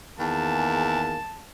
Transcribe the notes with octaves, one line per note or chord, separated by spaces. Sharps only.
E2 D#3 A#3 G#4 A5